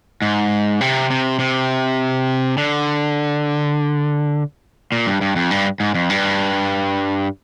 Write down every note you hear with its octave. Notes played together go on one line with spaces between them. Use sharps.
G#2
C3
C3
C3
D3
A#2
G2
G2
F2
G2
G#2
F2
G2